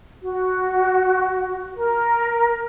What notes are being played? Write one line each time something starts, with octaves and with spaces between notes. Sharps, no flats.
F#4
A#4